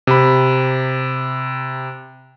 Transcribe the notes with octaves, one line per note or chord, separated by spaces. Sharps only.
C3 B5